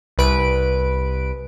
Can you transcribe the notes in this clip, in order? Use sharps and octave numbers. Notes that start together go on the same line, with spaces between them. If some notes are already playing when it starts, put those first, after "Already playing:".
C2 B4 D7